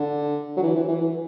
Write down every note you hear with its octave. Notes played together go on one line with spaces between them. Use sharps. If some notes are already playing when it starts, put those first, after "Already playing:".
Already playing: D3
F#3
E3
E3
E3
E3